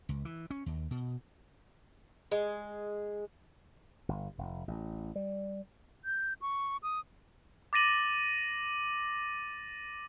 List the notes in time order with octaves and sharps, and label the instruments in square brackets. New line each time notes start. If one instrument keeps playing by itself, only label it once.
[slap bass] C#2
E3
C#4
D#2
B2
[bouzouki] G#3
[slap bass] G1
F1
A1
G3
[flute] G6
C#6
D#6
[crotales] D6 A6 A#6 D#7 F#7